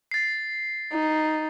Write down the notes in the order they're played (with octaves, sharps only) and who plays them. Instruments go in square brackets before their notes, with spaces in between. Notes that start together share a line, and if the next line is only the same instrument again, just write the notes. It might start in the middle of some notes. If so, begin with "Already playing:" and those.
[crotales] A6 C7
[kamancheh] D#4